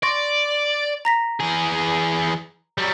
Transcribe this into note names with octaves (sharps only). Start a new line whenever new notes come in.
D5 C6 C#6 A#6
A#5 A#6 B6
E3 G#4
F#3 G3